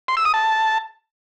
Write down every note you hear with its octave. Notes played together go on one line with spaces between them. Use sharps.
C6
E6
D#6
A5